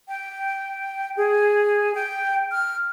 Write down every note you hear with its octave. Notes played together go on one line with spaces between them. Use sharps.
G5
G#4
G5
F6